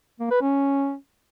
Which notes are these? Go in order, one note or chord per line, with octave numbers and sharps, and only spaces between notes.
A#3
B4
C#4